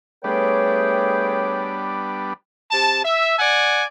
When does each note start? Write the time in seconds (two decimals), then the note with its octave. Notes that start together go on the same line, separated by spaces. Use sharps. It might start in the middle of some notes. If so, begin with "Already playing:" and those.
0.24 G3 A3 B3 D4 G#4 B4 C#5 G5
2.71 C3 A5
3.04 E5
3.39 D5 F#5 G#5